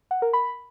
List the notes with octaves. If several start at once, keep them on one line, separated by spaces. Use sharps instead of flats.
F#5
A#4
B5